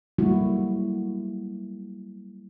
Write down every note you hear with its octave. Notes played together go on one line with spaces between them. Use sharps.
F#3 G3 A3 A#3 E4 F#4